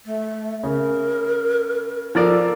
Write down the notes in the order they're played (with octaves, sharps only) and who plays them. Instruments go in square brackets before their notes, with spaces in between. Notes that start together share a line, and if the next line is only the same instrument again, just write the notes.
[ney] A3
[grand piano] C#3 [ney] A#4
[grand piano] F3 A#4 D5 [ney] A4